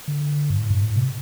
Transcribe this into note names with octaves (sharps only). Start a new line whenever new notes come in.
D3
G2
A2
G2
A2
C3